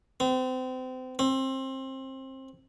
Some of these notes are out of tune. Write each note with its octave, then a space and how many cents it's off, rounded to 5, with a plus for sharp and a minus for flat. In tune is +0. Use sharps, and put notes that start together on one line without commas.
C4 -30
C4 +25